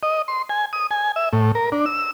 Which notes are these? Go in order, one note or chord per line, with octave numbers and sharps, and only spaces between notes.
D#5
C6
G#5
D#6
G#5
E5
A2
A#4
D4
E6